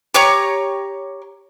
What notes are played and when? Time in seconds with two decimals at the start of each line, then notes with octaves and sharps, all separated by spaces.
0.14 G4 C#5 A#5 C#6